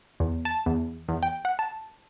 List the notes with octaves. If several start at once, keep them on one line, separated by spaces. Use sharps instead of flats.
E2
A5
E2
E2
G5
F#5
A5